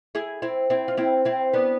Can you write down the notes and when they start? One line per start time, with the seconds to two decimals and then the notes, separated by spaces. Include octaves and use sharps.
0.15 E4 G#4
0.42 C4 E4
0.70 C4 E4
0.88 F4
0.97 C4 E4
1.25 C4 E4
1.53 B3 D4